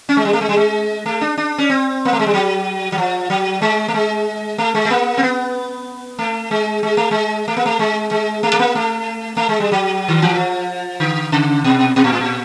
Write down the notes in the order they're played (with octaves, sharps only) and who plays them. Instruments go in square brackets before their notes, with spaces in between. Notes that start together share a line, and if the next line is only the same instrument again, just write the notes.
[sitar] C#4
G#3
G3
A3
G#3
G3
G#3
A3
D4
D4
C#4
C4
A#3
A3
G#3
G3
F#3
F#3
F3
F#3
G#3
A3
G#3
A3
G#3
A3
A#3
C4
B3
A3
G#3
G#3
A3
G#3
A3
A#3
A3
G#3
G#3
A3
A3
A#3
A3
A3
G#3
G3
F#3
D#3
E3
F3
D3
C#3
B2
B2
A#2
A2
A#2